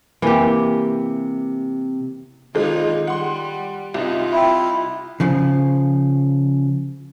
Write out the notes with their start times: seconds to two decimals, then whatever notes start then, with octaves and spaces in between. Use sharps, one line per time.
0.22 C3 E3 A#3 G4
2.55 G#1 D#3 G#3 D#4 F4 A4
3.07 G3 F#5 C6
3.94 C2 D#4 F4
4.33 E4 E5 G5
5.20 C#3 F3